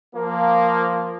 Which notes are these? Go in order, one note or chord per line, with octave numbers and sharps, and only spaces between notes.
F3 A#3